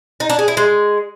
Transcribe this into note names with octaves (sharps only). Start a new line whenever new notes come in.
D#4
D4
G#4
E4
G#3